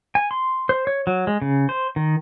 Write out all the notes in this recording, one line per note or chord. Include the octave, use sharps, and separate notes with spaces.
G#5
C6
C5
C#5
F#3
G#3
C#3
C5
D#3